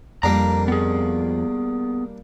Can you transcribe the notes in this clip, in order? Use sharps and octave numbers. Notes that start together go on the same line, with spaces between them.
F2 G3 A#3 D4 A#5
B3 G#4